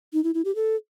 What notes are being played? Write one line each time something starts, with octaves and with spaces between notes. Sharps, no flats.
D#4
E4
E4
G4
A4